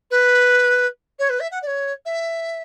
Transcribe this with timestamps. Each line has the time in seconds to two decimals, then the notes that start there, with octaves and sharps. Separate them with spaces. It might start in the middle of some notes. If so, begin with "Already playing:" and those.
0.10 B4
1.19 C#5
1.29 B4
1.40 E5
1.51 F#5
1.62 D5
1.67 C#5
2.05 E5